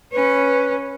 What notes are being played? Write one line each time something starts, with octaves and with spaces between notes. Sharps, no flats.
C#4 B4